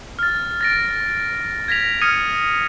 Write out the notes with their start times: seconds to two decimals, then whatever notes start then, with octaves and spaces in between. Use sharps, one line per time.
0.19 F6 A6
0.61 A6 A#6 D7
1.68 G#6 A#6 B6 F7
2.01 D#6 F6 G#6 C#7 D#7